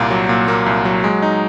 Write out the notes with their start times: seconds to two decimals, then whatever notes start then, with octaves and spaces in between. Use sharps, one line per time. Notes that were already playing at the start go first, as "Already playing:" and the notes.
Already playing: C2 A#2 A#3
0.10 F#3
0.29 A#2
0.48 A#3
0.66 C2
0.85 F#3
1.04 G#3
1.22 D#4